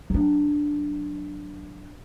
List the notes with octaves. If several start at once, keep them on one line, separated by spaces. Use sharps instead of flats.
F#3 D4